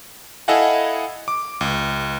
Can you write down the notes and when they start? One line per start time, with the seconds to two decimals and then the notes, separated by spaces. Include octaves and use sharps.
0.48 E4 A4 D#5 F5 F#5 G#5
1.28 D6
1.61 C#2